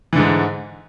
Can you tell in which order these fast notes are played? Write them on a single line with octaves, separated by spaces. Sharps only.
E3 D3 G#2